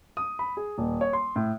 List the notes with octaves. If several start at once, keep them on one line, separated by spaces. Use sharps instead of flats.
D#6
B5
G#4
D#1
C#5
C6
A2